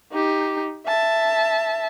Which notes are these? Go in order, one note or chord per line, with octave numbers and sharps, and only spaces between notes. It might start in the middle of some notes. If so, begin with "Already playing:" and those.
D#4 G4
E5 A5